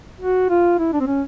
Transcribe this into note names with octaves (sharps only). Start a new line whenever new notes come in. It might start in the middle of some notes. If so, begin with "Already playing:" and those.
F#4
F4
E4
D4
C4
C#4